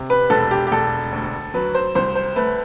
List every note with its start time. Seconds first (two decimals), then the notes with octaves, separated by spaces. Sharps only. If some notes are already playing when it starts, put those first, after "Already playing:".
Already playing: C3
0.10 B4
0.30 E1 A4
0.51 G4
0.67 G4
0.72 E1 A4
1.12 D2
1.54 F#3 B4
1.75 C5
1.95 C2 C5
2.15 C5
2.36 A3 B4